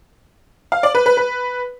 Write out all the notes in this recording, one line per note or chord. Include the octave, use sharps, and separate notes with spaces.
F5
D5
B4
B4
B4